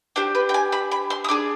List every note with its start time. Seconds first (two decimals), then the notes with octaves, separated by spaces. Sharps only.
0.16 D4 G4 C5
0.35 B4
0.49 G5
0.54 G#5
0.72 B5
0.91 B5
1.10 C6
1.24 D#6
1.29 D4 G#4 D6